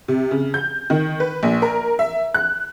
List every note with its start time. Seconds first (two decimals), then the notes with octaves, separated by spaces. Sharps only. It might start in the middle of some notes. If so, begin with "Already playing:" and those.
0.08 C3
0.31 C#3
0.54 G6
0.90 D#3
1.20 B4
1.43 A#1
1.62 A#4
1.99 E5
2.34 F#6